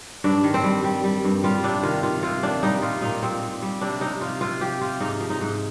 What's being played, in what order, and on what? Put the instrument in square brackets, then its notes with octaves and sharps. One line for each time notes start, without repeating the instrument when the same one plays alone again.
[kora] G2 D4
D#3
C4
G3
G3
G3
G2
G3 F4
C3 D4
D#3 F4
D#3 F4
C3 F4
D#3 D4
G3 D#4
A#2 F4
A#2 D#4
A#2 C4
A#2
G3
C3 D4
C3 D#4
F3 F4
C3 F4
F3 G4
F3 F4
G#2 D#4
F3
D#4
G#2